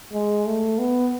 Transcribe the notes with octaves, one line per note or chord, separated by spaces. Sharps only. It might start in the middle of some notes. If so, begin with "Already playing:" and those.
G#3
A3
B3